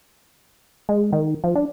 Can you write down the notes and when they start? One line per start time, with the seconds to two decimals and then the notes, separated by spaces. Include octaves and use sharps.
0.89 G#3
1.13 D#3
1.44 F3
1.56 D4